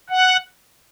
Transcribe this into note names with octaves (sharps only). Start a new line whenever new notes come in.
F#5